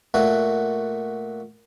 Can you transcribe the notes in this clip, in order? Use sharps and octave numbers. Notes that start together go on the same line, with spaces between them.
A#2 A3 F#4